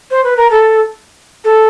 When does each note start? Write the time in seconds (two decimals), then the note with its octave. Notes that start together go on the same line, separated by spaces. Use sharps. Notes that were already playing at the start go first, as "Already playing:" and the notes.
0.10 C5
0.24 B4
0.36 A#4
0.50 A4
1.44 A4